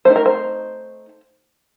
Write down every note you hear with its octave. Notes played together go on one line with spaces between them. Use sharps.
A3 C4 D#4 C5
A#4
C5